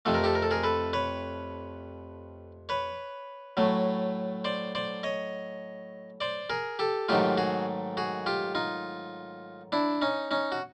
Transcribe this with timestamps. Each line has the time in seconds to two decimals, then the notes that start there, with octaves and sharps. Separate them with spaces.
0.05 F2 C3 F3 A3 A4
0.14 A#4
0.24 G4 A4
0.35 A#4
0.42 A4
0.51 G#4 A#4
0.64 A4 B4
0.93 B4 C#5
2.69 B4 C#5
3.57 A2 F#3 A3
4.44 C5 D5
4.75 C5 D5
5.03 C#5 D#5
6.21 C5 D5
6.50 G#4 A#4
6.79 G4 A4
7.09 G#2 D#3 F#3 A3 F4 G4
7.38 F#4 G#4
7.97 F#4 G#4
8.26 F4 G4
8.55 D#4 F4
9.72 D4 E4
10.02 C#4 D#4
10.31 C#4 D#4
10.52 F#4